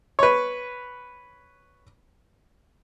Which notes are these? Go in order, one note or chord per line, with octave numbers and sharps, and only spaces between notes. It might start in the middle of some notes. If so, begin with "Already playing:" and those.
B4 C#5